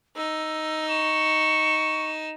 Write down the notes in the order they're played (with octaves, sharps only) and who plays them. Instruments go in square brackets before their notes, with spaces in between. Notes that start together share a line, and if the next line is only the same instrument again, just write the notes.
[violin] D#4 [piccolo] E6
[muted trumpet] C#6 [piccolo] E7